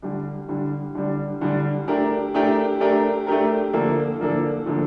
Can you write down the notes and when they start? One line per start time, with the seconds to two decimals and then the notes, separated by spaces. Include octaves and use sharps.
0.02 D3 G3 D4
0.49 D3 G3 D4
0.95 D3 G3 D4
1.41 D3 G3 D4
1.87 A3 D4 G4 A#4
2.34 A3 D4 G4 A#4
2.80 A3 D4 G4 A#4
3.27 A3 D4 G4 A#4
3.73 D3 F3 A#3 D4 A4
4.20 D3 F3 A#3 D4 A4
4.66 D3 F3 A#3 D4 A4